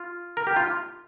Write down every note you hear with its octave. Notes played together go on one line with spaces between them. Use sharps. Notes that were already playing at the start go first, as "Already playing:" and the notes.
Already playing: F4
A#4
G4
F4